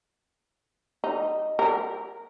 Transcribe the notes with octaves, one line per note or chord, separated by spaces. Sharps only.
D#4
A#4